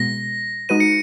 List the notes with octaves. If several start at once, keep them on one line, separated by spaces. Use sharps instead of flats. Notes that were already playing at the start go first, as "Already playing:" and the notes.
Already playing: B2 G#3 B3 A#6
G#3 D#4 F#4 B4 D#7
C#7